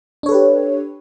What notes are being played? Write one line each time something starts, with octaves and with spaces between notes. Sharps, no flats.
D4 G4 A4 B4 C#5